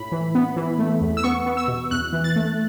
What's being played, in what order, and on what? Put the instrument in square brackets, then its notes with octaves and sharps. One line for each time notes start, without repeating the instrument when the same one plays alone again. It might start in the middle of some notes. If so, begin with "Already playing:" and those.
Already playing: [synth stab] A2 B5
E3
B3
E3
A3
E2
E6
B3 C#6
B3
E6
B2
E2 F#6
E3
A6
A3